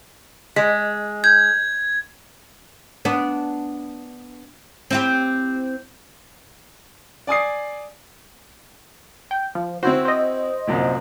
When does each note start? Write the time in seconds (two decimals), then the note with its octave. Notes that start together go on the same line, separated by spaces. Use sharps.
0.56 G#3 B6
1.24 G6 G#6
3.05 B3 D4
4.90 C4 E4 G4
7.27 D5 G#5 D#6 C7
9.31 G5
9.55 F3
9.83 C4 E4 F#4 C5
10.05 C5 D#5
10.67 C2 F#2 A#2